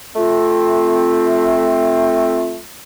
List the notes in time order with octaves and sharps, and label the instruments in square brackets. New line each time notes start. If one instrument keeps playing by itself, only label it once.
[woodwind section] A3 C4 F4